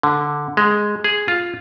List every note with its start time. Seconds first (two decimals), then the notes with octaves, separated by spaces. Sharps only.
0.03 D3
0.57 G#3
1.04 G#4
1.28 F4